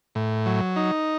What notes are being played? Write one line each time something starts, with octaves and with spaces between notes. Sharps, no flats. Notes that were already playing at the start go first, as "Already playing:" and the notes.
A2
F#3
D#4